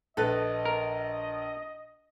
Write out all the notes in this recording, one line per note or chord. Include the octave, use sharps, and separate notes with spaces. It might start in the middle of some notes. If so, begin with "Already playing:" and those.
A#1 A4 B4 D#5
A#4